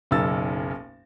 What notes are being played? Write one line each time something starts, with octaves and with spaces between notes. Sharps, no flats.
F#1 B1 D#4 A#4 E6 A6